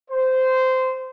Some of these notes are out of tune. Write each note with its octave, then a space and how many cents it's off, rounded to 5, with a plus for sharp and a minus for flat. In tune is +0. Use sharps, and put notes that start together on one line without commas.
C5 -15